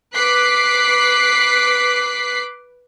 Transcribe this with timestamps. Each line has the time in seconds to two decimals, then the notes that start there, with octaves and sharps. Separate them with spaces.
0.14 B4 D6 F#6 B6 C7